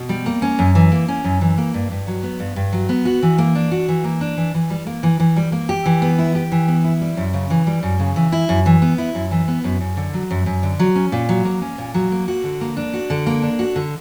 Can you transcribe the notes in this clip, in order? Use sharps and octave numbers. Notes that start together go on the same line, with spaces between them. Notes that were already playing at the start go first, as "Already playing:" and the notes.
Already playing: B2
G3
A#3
C#4
F#2
E3
A#3
C#4
F#2
E3
A#3
G2
G2
F#3
B3
G2
G2
F#3
B3
F#4
E3
A#3
D4
F#4
E3
A#3
D4
E3
E3
G3
A#3
E3
E3
G3
A#3
G4
E3
B3
E4
G4
E3
B3
E4
G3
F#2
C#3
E3
G3
F#2
C#3
E3
E4
F#2
E3
B3
E4
F#2
E3
B3
F#2
F#2
D3
F#3
F#2
F#2
D3
F#3
C#4
A#2
F#3
A#3
C#4
A#2
F#3
A#3
F#4
D3
A#3
D4
F#4
D3
A#3
D4
F#4
D3